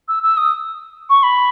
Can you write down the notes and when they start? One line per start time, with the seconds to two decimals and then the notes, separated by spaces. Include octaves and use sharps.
0.08 E6
0.23 E6
0.37 D#6
1.10 C#6
1.23 B5